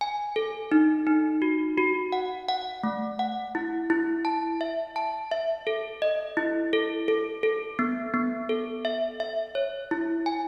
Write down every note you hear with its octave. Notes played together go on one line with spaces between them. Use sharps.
G#5
A4
D#4
D#4
F#4
F#4
F#5
F#5
A3
F#5
E4
E4
A5
E5
A5
E5
A4
D#5
E4
A4
A4
A4
B3
B3
A4
E5
E5
C#5
E4
G#5